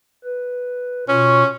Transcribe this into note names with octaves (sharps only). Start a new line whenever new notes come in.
B4
B2 C#4 F4 C#6